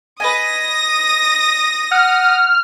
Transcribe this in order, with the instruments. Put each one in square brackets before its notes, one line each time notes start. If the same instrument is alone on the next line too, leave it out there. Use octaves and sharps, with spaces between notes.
[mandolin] B4 D#5 G#5 [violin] D#6 A#6
[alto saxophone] F#5 [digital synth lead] F6